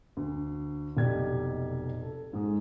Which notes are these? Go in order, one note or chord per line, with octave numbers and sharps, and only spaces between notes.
D2
F1 B1 G4 D5 G#6
A4
G#2 G#3